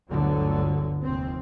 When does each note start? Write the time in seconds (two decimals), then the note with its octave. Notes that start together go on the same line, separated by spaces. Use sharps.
0.11 G1 D2 G2 D3 F#3
1.04 F1 D#2 C4